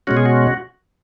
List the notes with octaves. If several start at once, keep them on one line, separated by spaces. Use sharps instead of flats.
B2 G#3 C#4 F#4
G#4
F#4